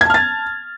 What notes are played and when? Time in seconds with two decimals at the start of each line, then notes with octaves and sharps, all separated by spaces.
0.01 G#6
0.05 A5
0.10 F6
0.14 A6